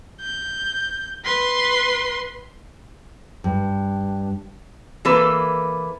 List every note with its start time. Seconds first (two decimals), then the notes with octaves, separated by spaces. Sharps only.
0.21 G6
1.25 B4 C6
3.44 G2
5.05 E3 A#3 A4 B4